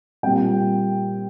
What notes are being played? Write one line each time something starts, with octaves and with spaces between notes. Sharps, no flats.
A#2 G3 C4 G5